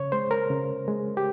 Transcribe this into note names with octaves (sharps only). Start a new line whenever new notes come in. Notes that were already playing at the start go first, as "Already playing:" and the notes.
Already playing: C#3 C#5
G#3 C5
A#4
C#3
G#3
G4